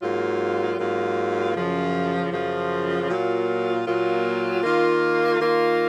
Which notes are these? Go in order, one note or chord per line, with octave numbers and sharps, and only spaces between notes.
G#2 F#3 A#3 F4
G#2 F#3 A#3 F4
F#2 C#3 F3
F#2 C#3 F3
A#2 F#3 A#3 F4
A#2 F#3 A#3 F4
D#3 A#3 F4
D#3 A#3 F4